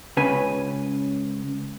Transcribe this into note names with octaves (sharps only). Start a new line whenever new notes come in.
C#2 C#3 B4 G#5